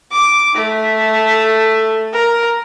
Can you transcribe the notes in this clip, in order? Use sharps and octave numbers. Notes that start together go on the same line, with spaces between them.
D6
A3
A#4